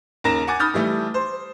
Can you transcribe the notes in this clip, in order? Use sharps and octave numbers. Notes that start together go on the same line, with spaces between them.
D#2 C#3 A#4 A#5 A#6 E7
F#5 G#5 D6 A6
B5 D#6 F6 G6 A6
E3 G3 A3
C5